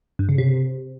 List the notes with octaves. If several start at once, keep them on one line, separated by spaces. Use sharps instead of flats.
G2
C#3
C3